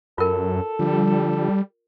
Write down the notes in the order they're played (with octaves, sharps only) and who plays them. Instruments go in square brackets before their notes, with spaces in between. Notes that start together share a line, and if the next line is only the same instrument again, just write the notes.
[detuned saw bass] F#2 [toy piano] F4 A#4 [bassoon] A4
[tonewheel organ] D3 F3 [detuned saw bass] G3